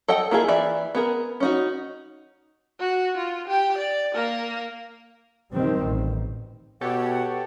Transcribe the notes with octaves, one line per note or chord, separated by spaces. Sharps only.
A4 D#5 F#5 G5
A#3 E4 F4 G#4
E3 D5 E5
B3 G#4 A#4
C#4 D#4 F#4
F#4
F4
G4 G5
D5
A#3 A#4
F2 B2 D#3 G3 C4
A1
B2 G4 A4 C#5 F#5